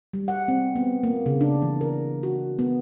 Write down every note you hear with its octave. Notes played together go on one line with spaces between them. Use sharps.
G3
F#5
C4
B3
A#3
C#3
D4
E3
A#4
F#4
B3